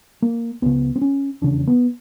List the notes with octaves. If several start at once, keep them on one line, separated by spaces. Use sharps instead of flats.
A#3
C#2 C#3 B3
C4
C#4
F1 E2 C#3 D4
B3